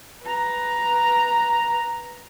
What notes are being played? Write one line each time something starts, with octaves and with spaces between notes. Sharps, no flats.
B4 A#5